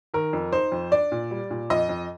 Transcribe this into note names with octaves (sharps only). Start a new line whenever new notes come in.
D#3 A#4
F2
D#4 C5
F2
D4 D5
A#2
G3
A#2
F2 D#5
F2